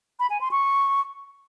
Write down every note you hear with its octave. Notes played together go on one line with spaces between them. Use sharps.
B5
G#5
C6
C#6